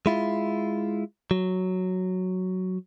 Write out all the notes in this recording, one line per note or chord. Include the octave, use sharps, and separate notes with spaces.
G#3 E4 F4
F#3